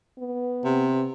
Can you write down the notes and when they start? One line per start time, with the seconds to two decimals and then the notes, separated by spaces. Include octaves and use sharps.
0.19 B3
0.65 C3